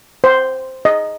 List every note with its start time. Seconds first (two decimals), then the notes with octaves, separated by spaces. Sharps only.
0.24 C5
0.85 D#5